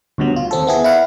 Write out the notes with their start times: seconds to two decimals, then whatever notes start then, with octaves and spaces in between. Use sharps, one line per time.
0.18 D2 G2 B2 F#3
0.36 F4
0.51 D#2 C4 A4
0.67 B3 E4 G#4
0.84 E4 F5 F#5